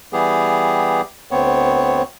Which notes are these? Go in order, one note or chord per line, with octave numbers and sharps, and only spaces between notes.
E3 G3 B3 G4 G#4
D2 B3 C4 C#5